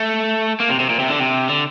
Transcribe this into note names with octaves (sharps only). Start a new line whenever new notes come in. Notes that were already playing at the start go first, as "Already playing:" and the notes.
Already playing: A3
A#3
C3
C3
A#2
C3
D3
C3
D3